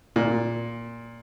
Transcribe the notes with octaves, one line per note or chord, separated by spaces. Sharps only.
A#2